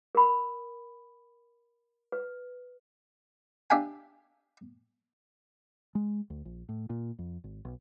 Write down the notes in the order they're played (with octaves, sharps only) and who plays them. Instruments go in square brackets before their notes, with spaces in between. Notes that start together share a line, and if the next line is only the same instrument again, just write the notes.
[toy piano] A#4 B5
B4
[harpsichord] D4 G4 E5 F5 G#5
[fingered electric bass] G#3
D2
A#1
A2
A#2
F2
G#1
B1